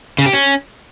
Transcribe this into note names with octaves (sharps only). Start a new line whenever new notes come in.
C#3
G4
C#4